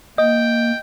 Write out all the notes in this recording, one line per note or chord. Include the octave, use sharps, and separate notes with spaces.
A#3 D#5 G5